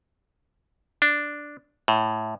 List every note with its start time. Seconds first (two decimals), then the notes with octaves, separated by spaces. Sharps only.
1.02 D4
1.88 A2